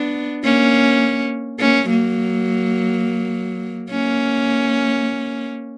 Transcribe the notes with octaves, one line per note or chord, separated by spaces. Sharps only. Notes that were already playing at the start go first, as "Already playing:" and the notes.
Already playing: B3 D4
A#3 C#4
A#3 C#4
F#3 A#3
A#3 C#4